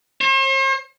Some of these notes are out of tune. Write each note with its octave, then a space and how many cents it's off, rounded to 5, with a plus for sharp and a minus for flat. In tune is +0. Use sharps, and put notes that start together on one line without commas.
C5 +45